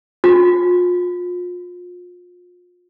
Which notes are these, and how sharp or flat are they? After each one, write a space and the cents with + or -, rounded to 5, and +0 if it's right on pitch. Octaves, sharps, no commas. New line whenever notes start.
F4 +30